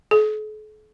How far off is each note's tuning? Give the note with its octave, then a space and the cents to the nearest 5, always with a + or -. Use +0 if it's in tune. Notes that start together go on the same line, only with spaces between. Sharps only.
A4 -45